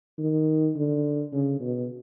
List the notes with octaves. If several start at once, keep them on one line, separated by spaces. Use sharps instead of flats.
D#3
D3
C#3
B2